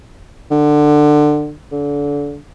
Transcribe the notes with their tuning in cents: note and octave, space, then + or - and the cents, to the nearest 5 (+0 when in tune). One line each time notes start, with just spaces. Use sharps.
D3 +20
D3 -30